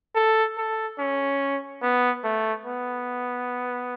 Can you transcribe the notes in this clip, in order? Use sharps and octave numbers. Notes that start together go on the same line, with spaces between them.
A4
A4
C#4
B3
A3
B3